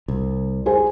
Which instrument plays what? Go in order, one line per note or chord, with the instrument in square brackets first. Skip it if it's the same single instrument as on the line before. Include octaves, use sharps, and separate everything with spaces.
[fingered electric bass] C2
[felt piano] G#4 C5 G#5